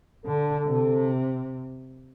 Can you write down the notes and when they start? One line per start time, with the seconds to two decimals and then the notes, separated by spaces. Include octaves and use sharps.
0.25 D3 A4
0.67 C3